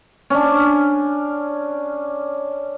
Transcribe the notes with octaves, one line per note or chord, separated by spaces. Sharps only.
C#4 D4